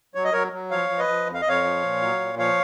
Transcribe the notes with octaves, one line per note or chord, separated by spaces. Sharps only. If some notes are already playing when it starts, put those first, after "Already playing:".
F#3 C#5
D#5
F#3 A#4 C#5
F#3
F3 C#5 F5
F3
B4 D#5
F3
F2
F5
D#5
F2 C#5 F5
F3
A#2
F#3
A#2
F3 C#5 F5